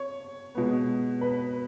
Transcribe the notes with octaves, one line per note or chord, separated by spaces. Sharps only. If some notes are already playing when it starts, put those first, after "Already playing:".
Already playing: C#5
B2 G#3 B3
B4